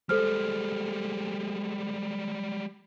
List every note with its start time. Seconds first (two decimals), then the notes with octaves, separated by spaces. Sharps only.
0.09 G3 G#3 A4 C5 F6